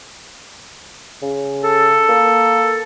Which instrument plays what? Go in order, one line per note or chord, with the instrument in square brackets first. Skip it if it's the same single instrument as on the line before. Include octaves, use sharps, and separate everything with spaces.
[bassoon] C#3
[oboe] A4
[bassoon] A#3